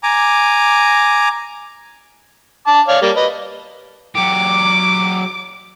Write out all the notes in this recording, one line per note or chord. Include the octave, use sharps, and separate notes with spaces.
G#5 A#5 D6
A5 D6
C#5 D5 F5
G3 A#3
B4 D#5
F#3 G4 D6